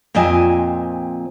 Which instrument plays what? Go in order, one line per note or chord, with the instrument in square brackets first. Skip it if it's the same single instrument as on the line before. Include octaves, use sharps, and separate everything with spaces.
[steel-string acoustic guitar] F2 A#2 C4 D#5 G#5